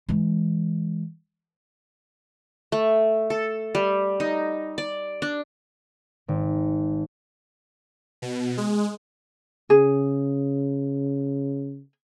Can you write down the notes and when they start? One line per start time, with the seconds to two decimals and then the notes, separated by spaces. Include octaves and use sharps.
0.09 E3 G#3
2.72 A3
3.30 A4
3.75 G3
4.20 D#4
4.78 D5
5.22 D4
6.28 G#1
8.22 B2
8.57 G#3
9.70 C#3 G#4